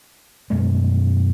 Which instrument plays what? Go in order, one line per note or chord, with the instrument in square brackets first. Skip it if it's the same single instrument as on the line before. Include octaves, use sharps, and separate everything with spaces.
[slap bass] F#2 B2 G#3 A3